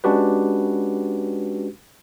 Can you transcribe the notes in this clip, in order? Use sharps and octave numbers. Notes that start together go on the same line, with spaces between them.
G#3 C#4 D4 F#4 G4 B4